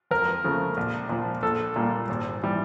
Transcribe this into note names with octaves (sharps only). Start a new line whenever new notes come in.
F2 A#4
C#3 F3 A3
A#1
A#2 F3
A#1 A4
A#2 G3 A#3
G#1
E3 G3